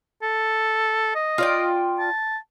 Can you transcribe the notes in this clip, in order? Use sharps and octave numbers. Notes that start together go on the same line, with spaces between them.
A4
D#5
F4 D5 G5
A5